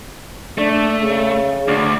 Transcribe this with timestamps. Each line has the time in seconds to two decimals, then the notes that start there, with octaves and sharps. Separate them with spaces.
0.58 A3 D4
1.01 C#3
1.68 D2 D4